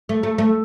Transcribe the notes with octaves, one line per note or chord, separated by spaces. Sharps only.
A3
A3
A3